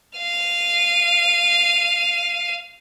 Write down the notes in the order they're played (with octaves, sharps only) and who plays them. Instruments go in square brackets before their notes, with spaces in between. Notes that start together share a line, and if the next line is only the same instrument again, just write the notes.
[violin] F5 D#7